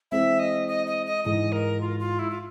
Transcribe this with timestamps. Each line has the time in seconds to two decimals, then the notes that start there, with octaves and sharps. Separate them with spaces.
0.11 E3 G#3 C4 E5
0.39 D#5
0.68 D#5
0.87 D#5
1.06 D#5
1.24 G#2 E3 G#3 D#5
1.52 A#4
1.81 F4
2.00 F4
2.19 E4
2.30 F4